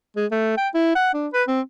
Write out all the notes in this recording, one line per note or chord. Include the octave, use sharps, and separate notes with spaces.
G#3
A3
G5
E4
F#5
D4
B4
C4